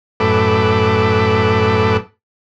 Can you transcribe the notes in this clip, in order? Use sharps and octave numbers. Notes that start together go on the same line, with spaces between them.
F#2 A2 A4 B4 D6